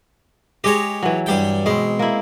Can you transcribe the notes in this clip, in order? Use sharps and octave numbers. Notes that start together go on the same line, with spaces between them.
G#3 G4 C#5 D#5
E3 F#3
G2 G3 G5
B2 G#3 C4
A#3 E4